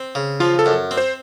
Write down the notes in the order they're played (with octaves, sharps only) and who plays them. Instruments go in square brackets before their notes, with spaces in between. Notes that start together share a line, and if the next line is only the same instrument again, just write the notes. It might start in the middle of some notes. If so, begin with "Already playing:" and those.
Already playing: [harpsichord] C4
C#3
[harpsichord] F3 [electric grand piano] F4
[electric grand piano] A4
[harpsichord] F#2
C4
[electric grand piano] C5